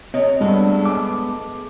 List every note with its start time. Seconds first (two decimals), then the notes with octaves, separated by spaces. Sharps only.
0.14 C3 C#5 D#5
0.41 G2 G#3 B3 A4
0.85 D6